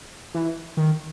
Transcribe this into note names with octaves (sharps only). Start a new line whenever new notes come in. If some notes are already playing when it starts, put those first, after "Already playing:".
E3
D#3